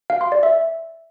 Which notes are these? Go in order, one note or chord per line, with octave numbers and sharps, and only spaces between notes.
F5
C6
D5
E5